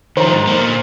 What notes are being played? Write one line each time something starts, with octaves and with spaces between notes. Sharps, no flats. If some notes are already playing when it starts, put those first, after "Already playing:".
D#3 F3 C5 A#5
G#2
D3 A#3
A#2